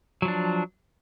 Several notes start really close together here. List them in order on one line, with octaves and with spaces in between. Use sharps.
F#3 F3 D4